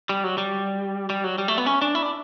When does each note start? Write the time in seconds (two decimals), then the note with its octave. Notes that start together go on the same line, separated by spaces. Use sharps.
0.09 G3
0.24 F#3
0.38 G3
1.10 G3
1.24 F#3
1.38 G3
1.48 A3
1.58 B3
1.66 C#4
1.82 D4
1.95 E4
2.03 D4